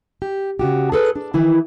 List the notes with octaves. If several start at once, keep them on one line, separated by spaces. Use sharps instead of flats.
G4
C#3 F#4 G4
G#4 A4 B4
D4
D#3 E3 E4